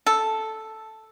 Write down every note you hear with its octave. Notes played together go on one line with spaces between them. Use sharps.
A4